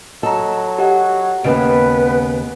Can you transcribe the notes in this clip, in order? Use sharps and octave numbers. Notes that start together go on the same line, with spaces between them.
F#3 A4 D#5 A#5
G4 D#5 F#5
D#2 C#3 A3 B3 B4 D#5 D7